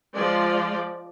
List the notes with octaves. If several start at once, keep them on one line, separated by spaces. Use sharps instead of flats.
F3 G#3 D5